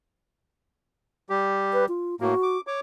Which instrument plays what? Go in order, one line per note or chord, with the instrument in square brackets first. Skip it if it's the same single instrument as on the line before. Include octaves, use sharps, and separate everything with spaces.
[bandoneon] G3 G4
[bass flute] B4
F4
[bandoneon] A2 A#3 [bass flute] F#4
[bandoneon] D6
C#5 D6